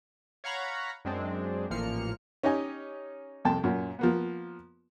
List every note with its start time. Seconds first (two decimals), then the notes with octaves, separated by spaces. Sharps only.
0.44 C#5 F5 F#5 A#5 B5 C#6
1.05 F#2 G#3 C4 D4
1.70 A1 A#2 F3 A#3 F6 C#7
2.43 C#4 D#4 G4 D#5 G#5
3.45 C2 F2 G5 A5
3.64 F#2 A#2
3.99 F3 A#3 B3